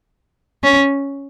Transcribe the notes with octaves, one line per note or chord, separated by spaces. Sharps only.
C#4